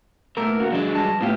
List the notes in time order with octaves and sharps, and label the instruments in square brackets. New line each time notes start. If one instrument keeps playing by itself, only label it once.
[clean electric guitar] B2 A3 A#3 [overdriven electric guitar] A#4
[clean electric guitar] C#3 F#4
[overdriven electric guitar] F#3 G#3 [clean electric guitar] D4
[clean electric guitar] G2 A5
[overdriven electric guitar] A2 [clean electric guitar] B3 F4 G4